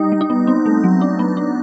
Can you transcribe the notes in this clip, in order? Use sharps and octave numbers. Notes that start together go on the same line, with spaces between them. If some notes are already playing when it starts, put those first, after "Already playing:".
Already playing: G3 D#4
G3
D#4
B3
C4
A3
F#3
D4
B3
D4